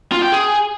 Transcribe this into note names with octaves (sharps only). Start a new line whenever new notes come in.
F4
G5
G#4